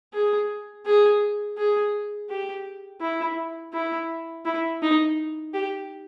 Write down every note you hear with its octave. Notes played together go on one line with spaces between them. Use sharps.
G#4
G#4
G#4
G4
E4
E4
E4
D#4
G4